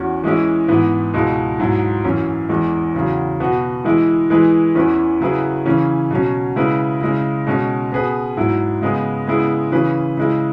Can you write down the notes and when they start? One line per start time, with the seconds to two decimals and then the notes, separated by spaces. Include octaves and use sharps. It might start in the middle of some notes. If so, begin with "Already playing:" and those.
Already playing: E2 C#4 F#4
0.24 E3 G#3 C#4 E4
0.68 G#2 E3 B3 E4
1.14 C#2 B2 G#3 E4
1.59 G#2 F#3 E4
2.04 F#2 E3 C#4
2.49 E2 E3 G#3
2.94 E2 C#3 F#3
3.40 B2 B3 F#4
3.85 E3 G#3 E4
4.30 E3 G#3 E4 G#4 B4
4.75 E2 E3 C#4 E4 B4
5.21 C#3 F#3 E4 G#4 B4
5.66 C#3 E3 C#4
6.11 B2 F#3 C#4
6.56 C#3 G#3 E4 B4
7.01 C#3 G#3 E4
7.47 B2 G#3 C#4
7.92 B2 B3 G#4 B4
8.37 G#2 F#3 E4
8.82 C#3 G#3 B3 G#4
9.27 C#3 G#3 B3 E4 G#4
9.72 C#3 E3 C#4 G#4 B4
10.17 C#3 G#3 E4